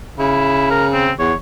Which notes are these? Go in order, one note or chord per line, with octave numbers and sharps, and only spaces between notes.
C#3 E4
A#4
C4
E2 C#5